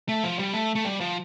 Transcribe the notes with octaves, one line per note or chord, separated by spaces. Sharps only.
A3
F3
G3
A3
A3
G3
F3